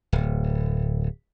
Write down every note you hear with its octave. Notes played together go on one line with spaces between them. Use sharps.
D1